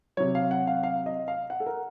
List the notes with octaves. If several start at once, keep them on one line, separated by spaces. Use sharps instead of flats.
C3 F#3 C#5
F5
F#5
F5
F5
D#5
F5
F#5
A4
A#4